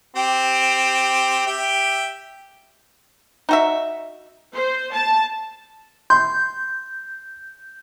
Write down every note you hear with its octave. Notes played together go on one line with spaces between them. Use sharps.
C4 G4
G4 E5 G5
D#4 F#4 E5
C5
A5
C6 G6